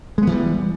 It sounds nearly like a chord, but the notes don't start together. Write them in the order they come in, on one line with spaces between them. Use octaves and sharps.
G#3 B3 E3 G3